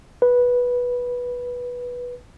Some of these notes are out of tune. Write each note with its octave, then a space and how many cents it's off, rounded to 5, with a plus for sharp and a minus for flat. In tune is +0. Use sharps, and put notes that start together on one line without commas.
B4 -10